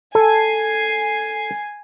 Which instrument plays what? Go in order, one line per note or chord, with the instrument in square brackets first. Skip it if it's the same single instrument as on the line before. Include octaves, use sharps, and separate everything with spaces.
[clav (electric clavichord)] A4 [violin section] G#5 C7